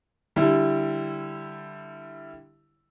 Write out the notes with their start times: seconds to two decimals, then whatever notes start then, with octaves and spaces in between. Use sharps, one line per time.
0.36 D3 G3 E4